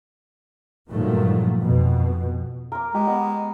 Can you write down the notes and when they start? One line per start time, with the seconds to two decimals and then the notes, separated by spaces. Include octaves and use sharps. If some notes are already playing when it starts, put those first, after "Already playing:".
0.89 G2 A#2 D#3 F3 F#3 A3
1.60 F2 B2
2.72 A#4 D6
2.94 G#3 G4
3.07 B3 D#5 F#5